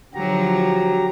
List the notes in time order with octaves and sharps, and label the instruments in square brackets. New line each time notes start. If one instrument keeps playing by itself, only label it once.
[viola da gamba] D3 F3 F#3 [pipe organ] F#4 G4 A#5